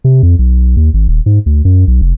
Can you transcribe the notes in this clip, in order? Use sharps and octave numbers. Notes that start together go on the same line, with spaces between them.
C3
F2
B1
D#2
G#1
D#1
G#2
D2
F#2
B1
F1